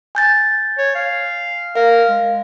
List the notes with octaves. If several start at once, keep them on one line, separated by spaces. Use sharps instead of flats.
G#5 G6 A6
C#5
F5
A#4 F5
G#3